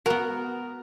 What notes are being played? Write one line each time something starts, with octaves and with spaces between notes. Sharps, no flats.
B3 F#4 A#4